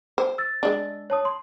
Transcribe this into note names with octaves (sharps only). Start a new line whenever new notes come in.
C5
E6 A6
G#3 D4
C#5 A5 D#6
C6